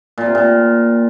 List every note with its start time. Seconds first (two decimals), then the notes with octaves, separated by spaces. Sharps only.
0.18 A#2
0.26 C3
0.35 A#2